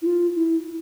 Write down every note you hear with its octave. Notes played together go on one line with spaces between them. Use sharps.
E4
F4
E4